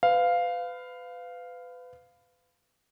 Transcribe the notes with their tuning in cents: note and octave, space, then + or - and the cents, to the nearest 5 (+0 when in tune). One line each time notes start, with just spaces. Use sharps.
B4 +30 F5 +0